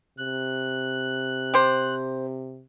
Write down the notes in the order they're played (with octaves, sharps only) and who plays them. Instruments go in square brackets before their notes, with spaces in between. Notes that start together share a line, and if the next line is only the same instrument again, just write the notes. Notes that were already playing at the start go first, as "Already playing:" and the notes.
[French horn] C3 [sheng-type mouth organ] F#6
[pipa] G4 C5